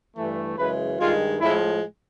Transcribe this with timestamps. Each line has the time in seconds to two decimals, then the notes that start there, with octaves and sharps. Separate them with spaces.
0.16 G2 E3 A3
0.57 F#2 C#3 E3 G#3 B4
0.99 G2 D#3 G#3 F4
1.41 A2 F3 G#3 E4